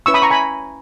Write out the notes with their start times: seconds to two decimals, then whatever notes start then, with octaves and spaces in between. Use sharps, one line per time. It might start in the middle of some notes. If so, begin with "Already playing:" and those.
0.06 C#4 E4 B4 C#6 E6
0.14 B5 D#6
0.22 A#5 C#6
0.30 G#5 B5